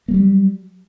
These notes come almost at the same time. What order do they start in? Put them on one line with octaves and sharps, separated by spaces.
A#3 F#3 G3